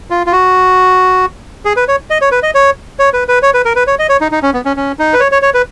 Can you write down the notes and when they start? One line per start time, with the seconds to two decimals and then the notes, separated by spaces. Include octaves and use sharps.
0.10 F4
0.27 F4
0.32 F#4
1.65 G#4
1.77 B4
1.88 C#5
2.10 D#5
2.21 C#5
2.32 B4
2.43 D#5
2.55 C#5
2.99 C#5
3.13 B4
3.28 B4
3.43 C#5
3.54 B4
3.65 A#4
3.76 B4
3.87 C#5
3.99 D#5
4.09 C#5
4.21 D#4
4.32 D#4
4.43 C#4
4.53 B3
4.65 C#4
4.77 C#4
4.99 D#4
5.13 B4
5.20 C#5
5.32 C#5
5.42 C#5
5.54 B4